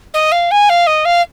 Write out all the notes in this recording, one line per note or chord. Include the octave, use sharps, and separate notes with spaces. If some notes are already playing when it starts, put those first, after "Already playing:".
D#5
F5
G#5
F5
D#5
F5